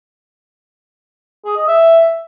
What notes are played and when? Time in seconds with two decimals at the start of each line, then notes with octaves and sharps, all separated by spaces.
1.45 G#4
1.56 D#5
1.67 E5